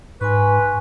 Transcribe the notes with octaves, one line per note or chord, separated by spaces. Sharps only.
G#2 B4 G#5 C6 C#6